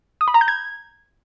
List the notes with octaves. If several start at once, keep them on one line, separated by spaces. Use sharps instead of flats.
D#6
B5
A#5
G6
G#6